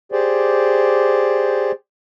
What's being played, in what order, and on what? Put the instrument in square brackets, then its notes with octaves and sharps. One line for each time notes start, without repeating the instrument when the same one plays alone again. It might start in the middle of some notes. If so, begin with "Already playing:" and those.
[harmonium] G4 G#4 C5 D5